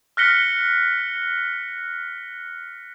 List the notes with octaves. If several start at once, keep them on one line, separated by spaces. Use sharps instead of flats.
F6 F#6 A#6 B6 C#7 G7